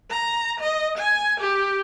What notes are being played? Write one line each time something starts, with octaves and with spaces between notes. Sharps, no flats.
A#5
D#5
G#5
G4